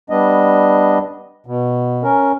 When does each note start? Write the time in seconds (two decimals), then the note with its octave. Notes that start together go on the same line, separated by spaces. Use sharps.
0.10 G3 B3 D4 D#5
1.46 B2
2.03 C#4 A#4